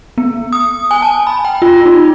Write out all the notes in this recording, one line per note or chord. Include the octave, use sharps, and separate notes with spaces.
B3
D#6
G#5
A5
B5
G5
F4
D#4